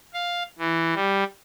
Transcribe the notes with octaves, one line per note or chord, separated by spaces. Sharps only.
F5
E3
G3